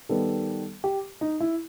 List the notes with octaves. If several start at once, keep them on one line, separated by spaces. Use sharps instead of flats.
D#3 G3 B3 A4
G4
D#4
E4